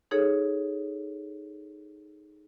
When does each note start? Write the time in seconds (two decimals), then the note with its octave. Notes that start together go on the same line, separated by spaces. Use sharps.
0.11 D#4 G#4 A4 C#5